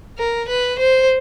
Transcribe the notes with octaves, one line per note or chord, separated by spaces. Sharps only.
A#4
B4
C5